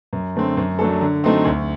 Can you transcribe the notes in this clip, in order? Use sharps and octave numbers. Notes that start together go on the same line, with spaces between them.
F#2
D3 A3 C4
F#2
F#3 A3 D4 A4
D3
F#3 A3 C4 D#4
D2